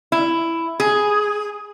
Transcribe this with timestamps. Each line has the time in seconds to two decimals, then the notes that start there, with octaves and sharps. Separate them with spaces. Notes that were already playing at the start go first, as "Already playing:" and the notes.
0.12 E4
0.80 G#4